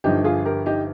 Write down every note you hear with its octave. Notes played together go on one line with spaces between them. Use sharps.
G1 G2 F3 D#4 G4
F4 G#4
G4 A#4
D#4 G4